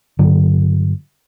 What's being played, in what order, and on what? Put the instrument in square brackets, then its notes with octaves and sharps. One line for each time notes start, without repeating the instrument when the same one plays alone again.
[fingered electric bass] G2 D3 F#3